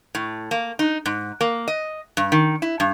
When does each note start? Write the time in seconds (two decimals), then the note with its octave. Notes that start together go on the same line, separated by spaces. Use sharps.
0.15 A2
0.51 A#3
0.79 D#4
1.06 G#2
1.41 A#3
1.68 D#5
2.17 G2
2.32 D#3
2.62 E4
2.80 G2